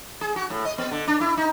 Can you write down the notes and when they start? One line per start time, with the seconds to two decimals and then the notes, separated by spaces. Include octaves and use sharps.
0.21 G#4
0.36 F#4
0.50 A2
0.65 D#5
0.78 B3
0.91 D3
1.08 D4
1.21 E4
1.37 D#4